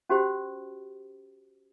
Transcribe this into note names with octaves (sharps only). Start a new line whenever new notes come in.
C#4 F#4 G4 C5